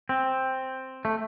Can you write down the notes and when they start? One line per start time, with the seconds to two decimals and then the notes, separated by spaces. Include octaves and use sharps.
0.09 C4
1.05 A3